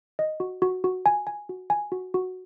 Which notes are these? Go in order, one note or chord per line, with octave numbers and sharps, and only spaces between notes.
D#5
F#4
F#4
F#4
G#5
G#5
F#4
G#5
F#4
F#4